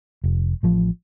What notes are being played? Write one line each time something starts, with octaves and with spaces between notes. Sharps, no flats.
F1
A1 F3